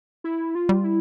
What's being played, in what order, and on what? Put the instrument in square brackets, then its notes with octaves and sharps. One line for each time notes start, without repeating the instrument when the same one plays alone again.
[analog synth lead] E4
F4
[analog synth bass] G3
[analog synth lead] E4